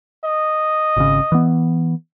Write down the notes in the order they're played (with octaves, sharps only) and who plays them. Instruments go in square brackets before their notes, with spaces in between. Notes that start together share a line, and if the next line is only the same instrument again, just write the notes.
[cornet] D#5
[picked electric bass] G#1 C#3
E3 B3